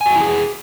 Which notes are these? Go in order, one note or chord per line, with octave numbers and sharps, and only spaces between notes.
E4 F#4 G#4 G5 G#5